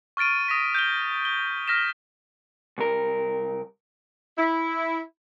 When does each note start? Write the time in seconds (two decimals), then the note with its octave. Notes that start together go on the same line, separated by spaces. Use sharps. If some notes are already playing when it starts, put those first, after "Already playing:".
0.17 C#6 F6 A6 D7 D#7
0.48 D#6 A#6 B6
0.75 G6 D7 G7
1.25 G7
1.68 F6 A#6 B6 E7
2.78 C2 A#4
4.38 E4